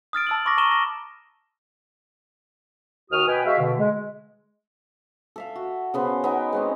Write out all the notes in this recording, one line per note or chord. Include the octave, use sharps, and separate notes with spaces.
D#6 F6 A6 D7
A5 E6 F#7
B5 C#6 D6 A#6
A#5 C#6 D#7 E7 G7
A#6
D#2 F#4 D#6 F6
B2 B4 G5 G#5
G#3 F#4 E5 F5
B2 D3
G#3
A4 E5 F5
F#4
C#3 B3 C5
B3 D#4 G5
G#3 C4 C#4